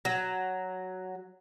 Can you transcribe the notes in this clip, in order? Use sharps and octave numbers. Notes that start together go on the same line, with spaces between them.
F#3